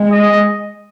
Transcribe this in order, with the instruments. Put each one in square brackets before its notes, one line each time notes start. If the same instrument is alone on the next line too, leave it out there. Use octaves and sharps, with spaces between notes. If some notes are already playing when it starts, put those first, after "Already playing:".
Already playing: [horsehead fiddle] G#3
[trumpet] D#5